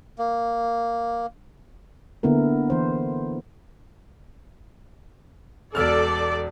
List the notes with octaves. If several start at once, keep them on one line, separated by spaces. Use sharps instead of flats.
A#3
D3 A#3 B3 E4 A#4
E3 C5
E1 A4 D5 E6 F6